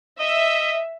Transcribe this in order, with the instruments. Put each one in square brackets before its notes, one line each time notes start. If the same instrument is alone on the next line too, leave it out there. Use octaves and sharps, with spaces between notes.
[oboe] D#5 [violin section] E5